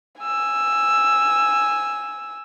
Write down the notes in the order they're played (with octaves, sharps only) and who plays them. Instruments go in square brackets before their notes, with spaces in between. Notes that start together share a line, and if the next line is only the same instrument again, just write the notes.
[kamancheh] G#5 E6